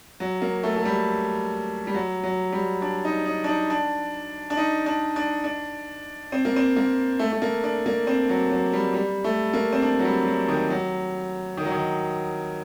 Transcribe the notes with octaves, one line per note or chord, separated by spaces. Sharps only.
F#3
A#3
A3
A3
G3
G3
F#3
F#3
G3
D4
D#4
D#4
D4
D#4
D4
D4
D#4
D4
D4
D4
C4
A#3
C4
A#3
A3
A3
A#3
D4
A#3
C4
F#3
F#3
G3
G3
A3
A#3
C4
D4
F#3
G3
F#3
D#3
F#3
D#3
F#3
D#3